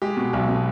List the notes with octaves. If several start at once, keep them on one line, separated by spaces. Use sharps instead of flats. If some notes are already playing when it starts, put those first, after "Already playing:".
G#3 G4
B2
B1
B2